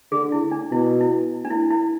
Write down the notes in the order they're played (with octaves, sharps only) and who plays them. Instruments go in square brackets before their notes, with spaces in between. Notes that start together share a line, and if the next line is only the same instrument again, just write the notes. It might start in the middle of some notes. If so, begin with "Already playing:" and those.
[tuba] D3 [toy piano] G#4
[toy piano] E4
D4
[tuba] B2 [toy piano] E4
[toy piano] E4
D4
E4
E4